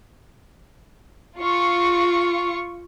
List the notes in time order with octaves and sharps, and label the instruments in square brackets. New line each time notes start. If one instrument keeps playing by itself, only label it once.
[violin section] F4 C#6